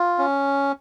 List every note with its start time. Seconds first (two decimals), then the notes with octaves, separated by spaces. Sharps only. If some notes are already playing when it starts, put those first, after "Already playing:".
Already playing: F4
0.19 C#4